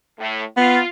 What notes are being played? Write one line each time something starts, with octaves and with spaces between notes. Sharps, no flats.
A2
B3 F4